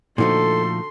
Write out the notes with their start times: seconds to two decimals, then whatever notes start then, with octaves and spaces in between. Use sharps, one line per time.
0.18 A#2 D3 F3 A3 D#4 F#4 A4 C6